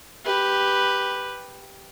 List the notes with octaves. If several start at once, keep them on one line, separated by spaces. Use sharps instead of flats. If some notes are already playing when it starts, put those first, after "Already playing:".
G4 B4